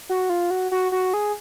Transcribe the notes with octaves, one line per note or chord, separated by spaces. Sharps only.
F#4
F4
F#4
F#4
F#4
G#4